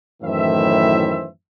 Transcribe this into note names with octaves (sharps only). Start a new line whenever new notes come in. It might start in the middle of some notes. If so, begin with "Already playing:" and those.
F#2 A2 D#3 E3 C5 E5